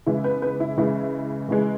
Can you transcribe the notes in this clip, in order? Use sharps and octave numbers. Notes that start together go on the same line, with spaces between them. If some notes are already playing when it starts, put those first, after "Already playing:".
C#3 E3 G#3 E4
B3 B4
B3 B4
E4
C#3 E3 G#3 E4
C#3 E3 G#3